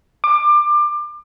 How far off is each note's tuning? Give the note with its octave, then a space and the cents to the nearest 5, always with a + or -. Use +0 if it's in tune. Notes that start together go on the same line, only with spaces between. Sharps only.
D6 +25